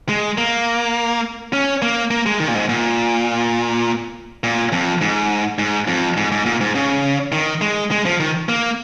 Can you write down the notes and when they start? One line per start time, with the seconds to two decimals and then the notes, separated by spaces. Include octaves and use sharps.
0.09 G#3
0.38 A#3
1.53 C#4
1.82 A#3
2.11 A#3
2.26 G#3
2.40 D#3
2.48 A#2
2.55 G#2
2.69 A#2
4.44 A#2
4.72 F2
5.01 G#2
5.59 G#2
5.88 F2
6.17 G#2
6.32 G#2
6.46 A#2
6.61 G#2
6.75 C#3
7.32 D#3
7.61 G#3
7.91 G#3
8.05 F3
8.20 D#3
8.49 A#3